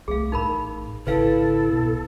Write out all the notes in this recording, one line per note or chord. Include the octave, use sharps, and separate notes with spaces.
C2 G3 A3 G#4 F5
A1 A2 D#4 A#4 B5
G#1 C#3 E4 A4 B4 F5
C2 B2